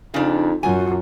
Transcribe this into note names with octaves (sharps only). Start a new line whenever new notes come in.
F2 C#3 D4 D#4
F#2 F4 F#4 G#5